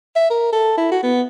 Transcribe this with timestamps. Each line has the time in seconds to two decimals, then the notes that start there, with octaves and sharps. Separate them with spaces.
0.16 E5
0.30 A#4
0.52 A4
0.77 E4
0.91 F#4
1.03 B3